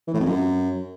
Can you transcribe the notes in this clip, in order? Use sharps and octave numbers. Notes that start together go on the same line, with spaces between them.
E3
A2
F2
F#2